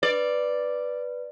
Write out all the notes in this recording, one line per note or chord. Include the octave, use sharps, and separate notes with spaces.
B4 D5